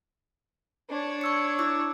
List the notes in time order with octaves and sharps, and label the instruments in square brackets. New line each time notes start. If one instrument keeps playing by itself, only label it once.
[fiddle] D4 C#5
[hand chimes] C#6 E6 C#7
E4 D6 E6